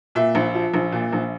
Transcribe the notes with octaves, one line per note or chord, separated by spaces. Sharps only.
A#2 E5
A#1
F3
A#1
A#2
A#1